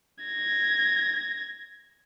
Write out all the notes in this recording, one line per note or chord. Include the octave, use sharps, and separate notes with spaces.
G#6 A#6